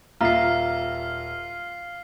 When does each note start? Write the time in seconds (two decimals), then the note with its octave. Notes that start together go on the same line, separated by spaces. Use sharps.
0.21 D#1 F4 E5 A#5 F6 C7